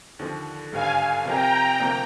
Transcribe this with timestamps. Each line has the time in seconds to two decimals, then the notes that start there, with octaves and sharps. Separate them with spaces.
0.19 D#2 D3 F3
0.72 G#1 G2 D3 G3 F5 G#5
1.25 C3 F3 C4 G4 A#4 G5 A#5
1.80 D2 C3 F3 A#3